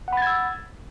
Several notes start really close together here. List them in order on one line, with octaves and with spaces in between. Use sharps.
F#5 B5 A6 G#6 E6